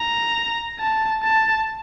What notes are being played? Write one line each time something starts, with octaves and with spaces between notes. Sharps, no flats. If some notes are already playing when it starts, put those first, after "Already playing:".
Already playing: A#5
A5
A5